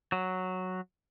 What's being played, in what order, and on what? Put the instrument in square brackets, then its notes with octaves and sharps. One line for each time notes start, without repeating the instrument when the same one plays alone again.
[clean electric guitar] F#3